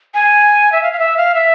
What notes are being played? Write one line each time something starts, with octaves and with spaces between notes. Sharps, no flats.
G#5
E5
F5
F5
E5
F5
E5